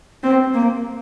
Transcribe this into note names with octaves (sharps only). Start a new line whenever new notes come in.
C4
A#3